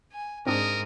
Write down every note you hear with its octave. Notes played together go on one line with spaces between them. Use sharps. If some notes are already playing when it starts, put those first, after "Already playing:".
G#5
G#2 C4 D4 A#4 D#6